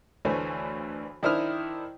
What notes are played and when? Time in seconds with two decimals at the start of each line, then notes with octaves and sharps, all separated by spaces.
0.25 D2 E3 A3 C5 C#5 G#5
1.23 D#3 D4 E4 C5 D#6 F6